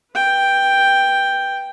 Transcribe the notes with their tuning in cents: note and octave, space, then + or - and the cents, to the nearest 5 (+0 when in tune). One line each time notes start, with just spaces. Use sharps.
B4 -20 G5 +5